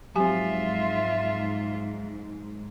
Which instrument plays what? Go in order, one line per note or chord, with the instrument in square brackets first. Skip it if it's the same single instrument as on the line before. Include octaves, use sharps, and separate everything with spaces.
[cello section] G#2 [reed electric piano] F3 F#3 C4 [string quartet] F4 E5 [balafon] G4 G#5